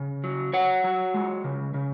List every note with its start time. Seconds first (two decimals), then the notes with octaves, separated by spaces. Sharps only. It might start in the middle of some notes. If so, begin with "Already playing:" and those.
Already playing: C#3
0.24 F#3
0.53 F#3 C#5 F#5
0.84 F#3
1.14 G#3
1.44 C#3
1.74 C#3